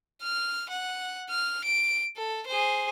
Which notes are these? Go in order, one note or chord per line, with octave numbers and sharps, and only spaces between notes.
F6
F#5
F6
D7
A4
G#4 C5